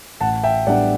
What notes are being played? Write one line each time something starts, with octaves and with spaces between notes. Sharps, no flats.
A1 F#5 A5
E5 G5
A2 G3 B3 D4 D5 F#5